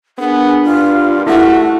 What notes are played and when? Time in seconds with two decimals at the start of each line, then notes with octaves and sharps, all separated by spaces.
0.18 B3 D4 G#4 A#4
0.64 G2 F4
1.27 A3 E4 F#4 G4